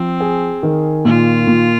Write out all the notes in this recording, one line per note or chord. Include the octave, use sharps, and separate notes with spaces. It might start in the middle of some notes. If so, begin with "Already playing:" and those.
Already playing: F3 C4
G#4
D#3
A#2 F4
A#2